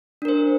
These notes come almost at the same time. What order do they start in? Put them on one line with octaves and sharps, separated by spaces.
D4 A#4 C5